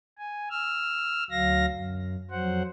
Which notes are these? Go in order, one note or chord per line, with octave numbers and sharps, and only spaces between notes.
G#5
E6 F6
D2 F#3 F5 A#6
F#2
F2 F#3 C5 F#5